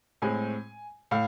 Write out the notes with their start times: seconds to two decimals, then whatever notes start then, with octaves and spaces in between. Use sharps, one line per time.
0.22 A2 G#3 C4 G#5
1.11 A2 F5